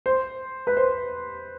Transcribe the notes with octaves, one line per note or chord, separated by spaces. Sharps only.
C5
B4
C5